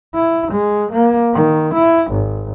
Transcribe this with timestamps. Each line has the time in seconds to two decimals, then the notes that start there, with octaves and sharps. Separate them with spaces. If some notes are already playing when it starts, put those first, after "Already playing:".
0.15 E4
0.52 G#3
0.92 A#3
1.34 D#3
1.74 E4
2.11 G#1